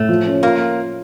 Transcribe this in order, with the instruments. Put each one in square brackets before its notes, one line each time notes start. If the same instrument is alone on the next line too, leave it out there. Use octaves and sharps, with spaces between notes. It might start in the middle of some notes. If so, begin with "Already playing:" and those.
Already playing: [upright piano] A2 [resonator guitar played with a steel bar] A3
[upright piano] F3
C#4
[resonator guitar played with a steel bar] A#3 [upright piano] F4